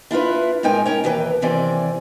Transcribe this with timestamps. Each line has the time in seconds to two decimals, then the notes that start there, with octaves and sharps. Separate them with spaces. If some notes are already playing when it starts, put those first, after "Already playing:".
0.11 D4 E4 F4 B4
0.63 A2 G#3 D#4 A#4 G5 G#5
0.86 C#4 A#4 C#5
1.04 D#2 E3 B4 C#5 G5
1.42 D#2 C3 E3 C4 D5 G#5